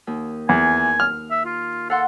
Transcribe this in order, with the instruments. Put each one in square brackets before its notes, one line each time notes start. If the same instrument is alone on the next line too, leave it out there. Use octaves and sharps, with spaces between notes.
[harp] D#2
[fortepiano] E2 [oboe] G#5
[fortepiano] F6
[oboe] E5
F4
[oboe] A4 [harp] F5 F#5 C6